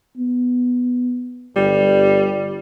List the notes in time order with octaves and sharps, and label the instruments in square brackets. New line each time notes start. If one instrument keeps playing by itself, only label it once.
[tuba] B3
[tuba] G1 [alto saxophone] G3